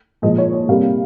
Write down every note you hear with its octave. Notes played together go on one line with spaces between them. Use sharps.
A#2 F3 G#3 D#5
C#5
C#5
C3 G3 A#3 F5